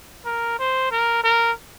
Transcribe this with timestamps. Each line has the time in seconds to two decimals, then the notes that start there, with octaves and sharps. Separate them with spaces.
0.25 A#4
0.59 C5
0.91 A#4
1.24 A#4